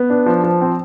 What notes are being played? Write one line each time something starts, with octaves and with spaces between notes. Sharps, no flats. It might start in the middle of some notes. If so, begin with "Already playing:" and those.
Already playing: B3
D4
F3
F3
C4